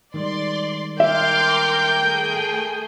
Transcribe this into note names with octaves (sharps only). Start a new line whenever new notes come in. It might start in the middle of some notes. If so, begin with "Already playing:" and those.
D#3 G3 G#3 D5 C6
A#4 E5 G5 C6 D6 F6 G6
A3 G#4